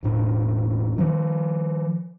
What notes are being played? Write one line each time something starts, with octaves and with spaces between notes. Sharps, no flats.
E1 A2 D4
D#3 F3